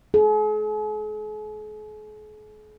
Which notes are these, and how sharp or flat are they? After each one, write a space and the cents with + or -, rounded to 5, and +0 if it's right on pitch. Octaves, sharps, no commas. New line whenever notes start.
G#4 +45